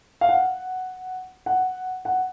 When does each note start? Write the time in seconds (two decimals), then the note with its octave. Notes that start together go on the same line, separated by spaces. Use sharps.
0.21 F5
0.29 F#5
1.46 F#5
2.05 F#5